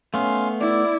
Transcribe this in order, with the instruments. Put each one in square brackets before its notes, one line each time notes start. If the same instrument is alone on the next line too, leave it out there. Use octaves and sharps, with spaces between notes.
[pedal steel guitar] A3 B3 [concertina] C#4 F5 C6
[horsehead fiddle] E4 [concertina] D5